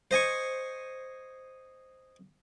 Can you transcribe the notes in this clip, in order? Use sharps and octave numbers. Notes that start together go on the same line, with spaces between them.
C5 D#5 G#5 C#6